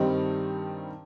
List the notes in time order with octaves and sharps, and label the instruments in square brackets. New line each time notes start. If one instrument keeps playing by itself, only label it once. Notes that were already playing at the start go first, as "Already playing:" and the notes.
Already playing: [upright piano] G2 D#3 G3 C4 D#4